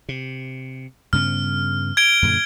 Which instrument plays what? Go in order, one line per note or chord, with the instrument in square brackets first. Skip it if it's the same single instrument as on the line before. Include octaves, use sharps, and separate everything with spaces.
[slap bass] C3
[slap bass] G2 C#3 B3 [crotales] F6
[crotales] G#6 D7 G7
[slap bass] F#2 A#2 D3